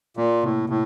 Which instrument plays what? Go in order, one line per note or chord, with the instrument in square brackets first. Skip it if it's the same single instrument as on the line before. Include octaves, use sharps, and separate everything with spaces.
[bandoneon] A#2 [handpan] A#3
[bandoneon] A2 [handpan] C3
[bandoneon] A2 [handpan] C3